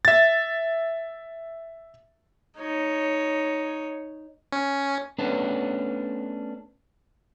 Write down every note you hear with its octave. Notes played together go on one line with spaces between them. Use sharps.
E5 A6
D#4 C#5
C#4
A3 B3 C#4 D4 B4 C5